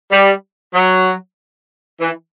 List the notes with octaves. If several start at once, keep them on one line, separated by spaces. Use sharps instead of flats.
G3
F#3
E3